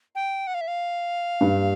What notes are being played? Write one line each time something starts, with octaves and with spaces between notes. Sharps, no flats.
G5
F#5
F5
E5
F5
G2